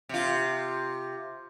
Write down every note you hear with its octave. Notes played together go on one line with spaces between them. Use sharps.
C3 F4